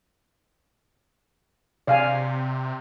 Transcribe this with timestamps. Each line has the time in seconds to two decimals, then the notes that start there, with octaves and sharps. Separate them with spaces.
1.87 C3 D5 F5 G#5